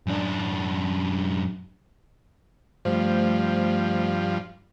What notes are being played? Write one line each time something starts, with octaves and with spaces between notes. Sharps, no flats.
F#2 D4
G2 F3 A3 C5